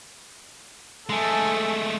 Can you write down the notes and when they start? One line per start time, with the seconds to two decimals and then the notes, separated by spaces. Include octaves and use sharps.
1.09 G#3 A3 A4 G#5